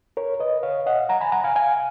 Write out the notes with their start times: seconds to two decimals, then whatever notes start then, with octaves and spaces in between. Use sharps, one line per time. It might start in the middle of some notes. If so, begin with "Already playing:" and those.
0.17 A#4 C#5
0.40 B4 D#5
0.63 C#5 F5
0.86 D#5 F#5
1.09 F#5 A#5
1.21 G#5 B5
1.32 F#5 A#5
1.44 F5 G#5
1.56 F5 G#5